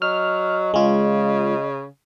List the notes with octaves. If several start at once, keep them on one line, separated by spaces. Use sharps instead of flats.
F#3 D#5 F6
C#3 G#3 F4